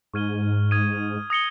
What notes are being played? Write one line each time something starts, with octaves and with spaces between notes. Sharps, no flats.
G#2 C#6 F6 G#6 D#7 G7
D#6 G#6 D#7
D#6 A#6 C#7 G7